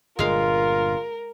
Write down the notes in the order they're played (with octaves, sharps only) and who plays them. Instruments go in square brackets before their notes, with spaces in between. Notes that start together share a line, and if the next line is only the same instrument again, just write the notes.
[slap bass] G1 A#2 [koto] G#3 F5 [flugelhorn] F4 [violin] A#4